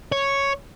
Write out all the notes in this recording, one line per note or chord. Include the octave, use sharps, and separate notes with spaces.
C#5